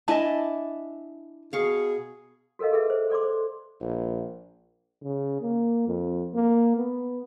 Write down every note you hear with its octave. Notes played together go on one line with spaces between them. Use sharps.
D4 E4 D#5 E5 G#5 A5
B2 G#4 F5 C#6
F#4 A4 A#4 D#5 F5
F#4 G#4 A4 B4 E5
C5
A4 D5 C6 D6
C5
A#1
C#3
A#3
F2
A#3
B3